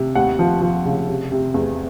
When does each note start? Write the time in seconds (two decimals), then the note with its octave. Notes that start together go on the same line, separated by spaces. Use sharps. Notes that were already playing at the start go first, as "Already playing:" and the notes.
Already playing: C3
0.15 D#2 F#5
0.39 F3
0.62 F3
0.86 C#3
1.08 C3
1.32 C3
1.54 E2